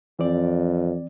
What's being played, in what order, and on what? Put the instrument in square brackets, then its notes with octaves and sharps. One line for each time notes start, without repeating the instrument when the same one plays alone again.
[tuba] F2 [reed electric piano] E3 C4 D5